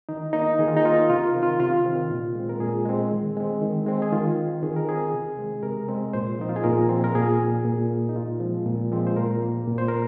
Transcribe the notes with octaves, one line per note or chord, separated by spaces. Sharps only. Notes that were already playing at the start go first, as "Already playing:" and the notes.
D#3 D#4
A#3 D#4
D#3 G#4
F4
D#4
A#3 F4
C3 F4
A#4
D#3 C4
F4
C3 F4
D#3 C4
A#2
G#3 C4
A#4
A#2 G#4
G#3 C4
D#3
G#3 C4
D#3
G#3 C4
G#4
D#3 F4
C4
D#3 G#4
A#4
C4 G#4
C3
G#3 C4
C3 A#4
G#3 C4
A#2 C5
F3 C4 D#4
F4
G#4
A#2 A#4
F3 C4
A#4
A#2 G#4
A#3
A#2
A#3
D#4
A#2 F4
F3 G#3 C4
A#2
F3 G#3 C4
C5
A#2 A#4
A#3
A#2
C5
A#4